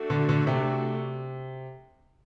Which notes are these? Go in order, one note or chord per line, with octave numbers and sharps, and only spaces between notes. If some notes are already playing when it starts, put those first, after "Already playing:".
Already playing: A3 D4 F#4
D3
D3
C3